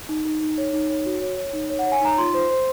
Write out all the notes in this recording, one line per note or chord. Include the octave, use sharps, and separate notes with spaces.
D#4
D#4
D#4
C#5
D#4
C#5
F#4
C#5
C#5
D#4
C#5
F#5
C#5
G#5
D#4 A#5
F4 C6
C5
C5